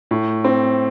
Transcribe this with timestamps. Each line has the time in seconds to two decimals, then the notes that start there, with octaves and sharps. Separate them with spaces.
0.11 A2
0.44 C4